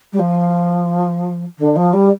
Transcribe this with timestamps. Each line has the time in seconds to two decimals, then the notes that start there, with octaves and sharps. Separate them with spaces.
0.12 G3
0.19 F3
1.58 D3
1.76 F3
1.93 G3